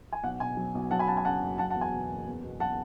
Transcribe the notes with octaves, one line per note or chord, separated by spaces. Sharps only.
G#5
B1 F#5
B2 G#5
F#3
B1
F#3 F#5 A5
G#5 B5
F#2 F#5 A5
G#5
C#3 F#5 A5
F#1
F#3 F#5 A5
F#5 A5
E2
G#5
B2
F#1
E2
B2
F#3 F#5 A5